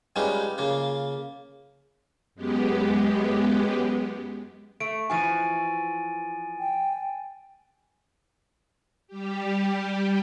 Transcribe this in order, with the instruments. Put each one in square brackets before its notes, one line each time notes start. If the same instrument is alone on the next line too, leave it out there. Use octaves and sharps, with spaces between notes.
[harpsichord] G3 G#3 B3 C#4 D#4 F4
C#3 A#3 F4
[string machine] F#2 G#3 B3 G4
[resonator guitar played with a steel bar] A3 [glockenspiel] D7
[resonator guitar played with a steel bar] E3 F3 F#4 [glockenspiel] G#5 A6 D#7
[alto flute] G5
[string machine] G3 G4